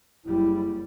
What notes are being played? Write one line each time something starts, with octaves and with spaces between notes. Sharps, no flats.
F#1 G3 E4